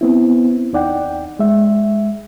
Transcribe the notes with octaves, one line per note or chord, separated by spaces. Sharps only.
B3 C4 E4
D#2 D#4 D5 F#5 G5
G#3 E5